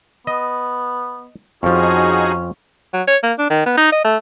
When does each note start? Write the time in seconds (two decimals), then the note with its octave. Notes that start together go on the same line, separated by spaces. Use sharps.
0.27 B3 D#5
1.63 F2 F3 C#4 D#4 F#4 G#4
2.94 F#3
3.08 C#5
3.23 A#3
3.39 D4
3.50 D#3
3.66 B3
3.78 D#4
3.92 D#5
4.05 A3